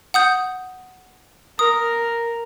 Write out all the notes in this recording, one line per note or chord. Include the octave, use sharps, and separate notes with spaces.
F#5 D#6 G6
A#4 D#6